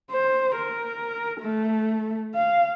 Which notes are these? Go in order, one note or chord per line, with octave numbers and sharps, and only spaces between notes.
C5
A#4
A3
F5